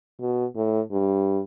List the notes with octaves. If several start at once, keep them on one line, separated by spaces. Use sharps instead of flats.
B2
A2
G2